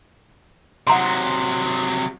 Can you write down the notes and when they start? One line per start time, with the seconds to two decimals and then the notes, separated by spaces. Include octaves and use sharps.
0.87 C3 F#3 F#5 A#5 C6